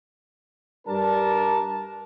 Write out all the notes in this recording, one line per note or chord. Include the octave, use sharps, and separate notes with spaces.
G2 D4 A#4 A5